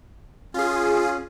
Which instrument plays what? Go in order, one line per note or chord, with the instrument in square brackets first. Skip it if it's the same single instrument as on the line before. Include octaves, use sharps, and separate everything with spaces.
[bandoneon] C#4 [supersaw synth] F4 G#4